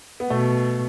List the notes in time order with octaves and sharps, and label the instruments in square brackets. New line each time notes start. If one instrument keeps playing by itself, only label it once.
[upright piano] B3
[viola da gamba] B2 [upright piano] A3